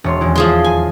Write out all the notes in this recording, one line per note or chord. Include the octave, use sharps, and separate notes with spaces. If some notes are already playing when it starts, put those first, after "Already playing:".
E1 C#5 C6
D#1 E2 E4
F3 G#3 G#4 C6
G#5